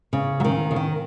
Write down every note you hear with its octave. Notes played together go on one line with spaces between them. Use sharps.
C#3
F#3
D#3
C#3
D#3